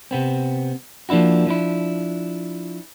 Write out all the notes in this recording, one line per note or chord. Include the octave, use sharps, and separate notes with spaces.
C3 B3 C4
F3 A#3 D4 E4 F#4
F3 D4 E4